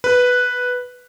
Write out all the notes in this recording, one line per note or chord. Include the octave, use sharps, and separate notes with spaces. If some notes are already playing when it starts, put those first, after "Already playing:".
B4